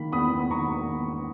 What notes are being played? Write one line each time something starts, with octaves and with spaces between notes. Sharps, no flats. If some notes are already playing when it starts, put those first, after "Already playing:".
Already playing: D#3 A#3 B5
E2 B5 D#6
E2
B5
D#3 A#5 C#6
A#3
E2